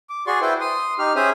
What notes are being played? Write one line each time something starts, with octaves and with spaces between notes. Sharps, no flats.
D6
F#4 G#4 D5 C6 C#6
E4 B4 C5 G5
C6 D#6
D#4 G4 F6
C#4 G#4 C5 E5 D#6